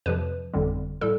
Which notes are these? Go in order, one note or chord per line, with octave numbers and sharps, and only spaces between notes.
F2 C3 F3 B4
G1 F2 D3 G3
A2 G3 A4